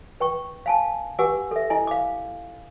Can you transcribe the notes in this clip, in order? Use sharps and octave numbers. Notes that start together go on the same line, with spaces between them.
B4 G5 C#6
F5 G#5 A5
G4 B4 F#5 G#5 D6 E6
A4 E5
E4 D#5 G#5
F5 D6